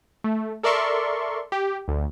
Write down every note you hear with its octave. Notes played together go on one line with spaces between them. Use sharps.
A3
A4 A#4 D5 E5 C6 C#6
G4
D2